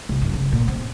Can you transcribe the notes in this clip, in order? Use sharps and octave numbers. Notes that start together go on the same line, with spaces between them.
C2
F#2
C#3
A#2
C4